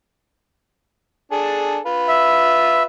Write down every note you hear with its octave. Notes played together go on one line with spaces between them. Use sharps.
D4 G#4 A4
F4 B4
E5